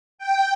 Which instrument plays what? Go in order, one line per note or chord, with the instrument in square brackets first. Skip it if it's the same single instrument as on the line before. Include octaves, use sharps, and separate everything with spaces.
[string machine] G5